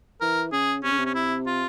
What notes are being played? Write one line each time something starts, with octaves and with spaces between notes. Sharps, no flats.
E3 A#4
C#3 G#4
C3 C#4
C#3
C3
C#4
E4
F4